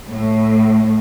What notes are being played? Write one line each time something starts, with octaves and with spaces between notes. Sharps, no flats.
A2